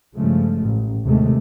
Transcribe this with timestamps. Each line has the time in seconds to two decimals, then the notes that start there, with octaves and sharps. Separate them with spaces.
0.15 G2 C#3 F3 G#3 A3
0.61 A1
1.04 D#2 C3 D#3 G#3 A3